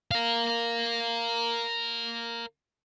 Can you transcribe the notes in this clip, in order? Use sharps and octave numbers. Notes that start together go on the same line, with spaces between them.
A#4 F5